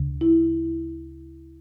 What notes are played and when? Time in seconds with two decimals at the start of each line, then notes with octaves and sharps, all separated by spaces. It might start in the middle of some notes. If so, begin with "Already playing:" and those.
Already playing: D2 C#3
0.21 E4